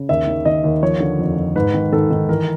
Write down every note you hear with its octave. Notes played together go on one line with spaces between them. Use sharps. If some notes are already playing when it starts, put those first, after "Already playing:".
Already playing: C#3
D#2 E5
D#3
D#3 D#5
D#2
F3 C#5
D3
F2
F2
G#2 B4
D#3
D#3 A4
D#3
E3 A#4